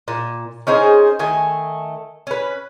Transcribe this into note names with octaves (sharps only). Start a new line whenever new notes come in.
A#2
C#4 D#4 G#4 C5
D#3 A3 G#5
C#4 B4